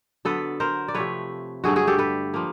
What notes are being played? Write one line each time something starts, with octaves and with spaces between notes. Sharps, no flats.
D3 F#3 B3 A4 B4
A#4 C5
D5
C3 F3 A3 B4 C#5
G2 D3 F#3 A3 F#4 G#4
F#4 G#4
G4 A4
A4 B4
F3 A#3